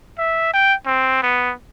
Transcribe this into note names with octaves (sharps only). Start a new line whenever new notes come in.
E5
G5
C4
B3